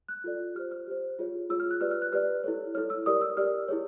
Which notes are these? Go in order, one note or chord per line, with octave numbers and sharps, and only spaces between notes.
F#6
F4 A4 D5
G4 C5 F6
F6
G4 C5
F4 G#4 C#5
F4 G#4 C#5 E6
F6
F#6
G4 B4 D5 F6
F6
F#6
G4 B4 D5 F6
E4 A4 C#5
E4 A4 C#5 F6
E6
G4 A#4 D5 D#6
E6
G4 A#4 D5 F6
E4 G#4 C#5